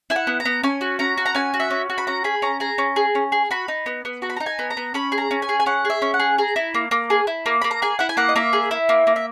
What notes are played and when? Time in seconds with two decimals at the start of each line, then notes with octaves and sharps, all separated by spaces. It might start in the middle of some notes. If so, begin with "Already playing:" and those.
0.10 E4 G#5
0.16 F#5
0.27 B3
0.40 A#5
0.45 B3
0.63 C#4 G#5
0.81 F#4
0.99 C#4 A#5
1.17 F#4
1.26 A#5
1.35 C#4 G#5
1.54 F#4
1.60 E5
1.70 C#4
1.90 F#4
1.98 B5
2.07 C#4 A#5
2.24 G#4 B5
2.42 C#4 A#5
2.60 G#4 A#5
2.78 C#4
2.96 G#4
3.15 C#4
3.32 G#4
3.51 F#4 B5
3.68 D#4
3.86 B3
4.05 B3
4.22 F#4 A#5
4.30 B5
4.36 A#5
4.40 D#4
4.46 G#5
4.59 B3
4.70 A#5
4.77 B3
4.94 C#4 B5
5.12 G#4
5.18 A#5
5.31 C#4
5.42 G#5
5.49 G#4
5.60 G#5
5.66 C#4 F#5
5.85 G#4
5.90 E5
6.02 C#4
6.14 F#5
6.19 G#4
6.38 G#4 A#5
6.56 E4
6.74 A#3
6.91 A#3
7.10 G#4
7.27 E4
7.46 A#3
7.62 A#3 B5
7.71 A#5
7.82 G#4 G#5
7.99 E4 F#5
8.09 G#5
8.17 A#3 F#5
8.29 D#5
8.36 A#3 E5
8.53 G#4
8.71 E4
8.89 A#3
9.07 A#3
9.16 E5